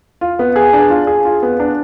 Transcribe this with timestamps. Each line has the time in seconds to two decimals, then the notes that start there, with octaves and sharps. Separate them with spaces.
0.21 F4
0.39 B3
0.56 G#4
0.73 D4
0.90 F4
1.07 G#4
1.25 F4
1.43 B3
1.60 D4